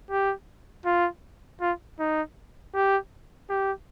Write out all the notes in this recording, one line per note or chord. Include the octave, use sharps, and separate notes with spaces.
G4
F4
F4
D#4
G4
G4